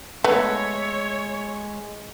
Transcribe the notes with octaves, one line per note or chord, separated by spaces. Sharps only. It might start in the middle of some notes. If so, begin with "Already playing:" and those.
G#3 A3 B3 C#5 E5